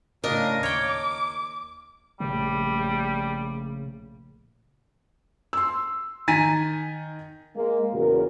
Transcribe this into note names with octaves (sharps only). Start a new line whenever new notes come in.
A2 C#3 D4 A#4 D#5 F5
D#2 C#5 G5 D6
A#1 A2 C#3 G3
C6 E6
D#3 G#5 A#5 A6 B6 D#7
G#3 A#3
E2 A#2 C#3 F#4 A#4